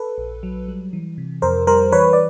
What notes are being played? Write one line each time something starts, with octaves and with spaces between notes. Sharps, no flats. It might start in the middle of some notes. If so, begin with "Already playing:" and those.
Already playing: A4 B4
A#1
F#3
G3
E3
C3
F2 A#4 C5
G3 A#4 C5
E3 B4 C#5
D5